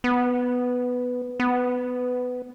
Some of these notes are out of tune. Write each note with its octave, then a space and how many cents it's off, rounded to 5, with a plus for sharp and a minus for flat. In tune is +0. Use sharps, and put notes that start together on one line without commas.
B3 +5
B3 +15